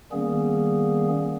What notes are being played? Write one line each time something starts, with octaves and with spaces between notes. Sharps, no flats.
D#3 G3 A#3 B3 C#4 G#4